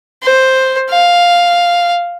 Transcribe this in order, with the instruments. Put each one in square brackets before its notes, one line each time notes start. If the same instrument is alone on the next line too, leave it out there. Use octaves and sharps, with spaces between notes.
[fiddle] C5
F5